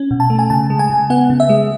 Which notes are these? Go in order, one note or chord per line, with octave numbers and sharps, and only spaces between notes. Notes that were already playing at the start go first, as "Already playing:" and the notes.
Already playing: C#4
B2
A5
A3
G#5
C#3 A5
G#3
G#5
C#3
B3 F#5
C#3
E5
G#3